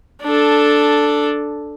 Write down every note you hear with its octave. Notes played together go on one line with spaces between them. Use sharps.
D4 A4